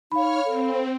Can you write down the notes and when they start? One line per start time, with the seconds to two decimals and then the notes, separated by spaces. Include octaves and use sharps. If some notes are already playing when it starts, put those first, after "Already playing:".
0.12 D#4 C#5 F5 B5 F6
0.45 C4 A4